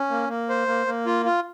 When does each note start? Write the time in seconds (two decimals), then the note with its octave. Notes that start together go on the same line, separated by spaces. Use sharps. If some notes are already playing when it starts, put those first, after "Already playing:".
Already playing: C#4
0.10 A#3
0.29 A#3
0.49 C5
0.68 A#3
0.87 A#3
1.06 F4
1.26 F4